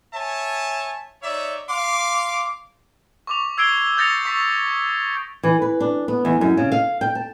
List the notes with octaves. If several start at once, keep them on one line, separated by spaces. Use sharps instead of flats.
C#5 E5 G#5 A5
D#4 C#5 D5 E5
F5 C6 D6
C#6 D6 F7
E6 G#6 C7 D7 G7
D#6 G6 A6 A#6 C#7 F7
C#6 D#6 B6
E3
B4
D4
B3
E2
F#2
C#3
F5
G5
A5